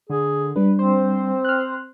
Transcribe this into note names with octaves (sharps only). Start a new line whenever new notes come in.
D3 G#4
G3 D4 B4
C4 C5
F6 F#6